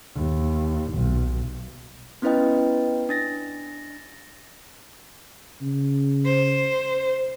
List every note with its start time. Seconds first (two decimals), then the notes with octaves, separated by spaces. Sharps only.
0.15 D#2
0.93 B1
2.22 B3 C#4 E4 B4 D#5 G5
3.09 D4 A6 A#6
5.62 C#3
6.25 C5